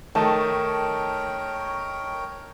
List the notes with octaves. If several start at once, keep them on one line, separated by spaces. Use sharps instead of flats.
D#3 A3 D#4 A#4 C#5 G5 A5